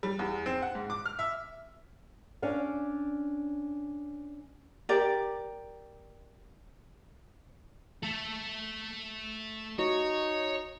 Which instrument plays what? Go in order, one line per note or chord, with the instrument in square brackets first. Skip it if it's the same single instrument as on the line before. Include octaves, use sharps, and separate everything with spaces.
[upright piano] G3
E2
C4
F#5
G#2
D6
F6
E5
[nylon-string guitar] C#4 D4 F5
[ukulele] G4 A#4 D5
[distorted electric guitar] A3 A4
[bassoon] D#4 [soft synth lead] F#4 [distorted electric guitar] C#5